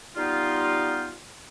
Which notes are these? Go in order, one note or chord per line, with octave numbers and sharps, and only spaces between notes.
G3 B3 D#4 F4